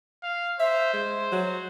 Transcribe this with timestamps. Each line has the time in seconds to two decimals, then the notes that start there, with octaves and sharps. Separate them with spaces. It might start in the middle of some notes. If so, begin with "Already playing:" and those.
0.23 F5
0.60 C5 E5
0.93 G#3
1.32 F#3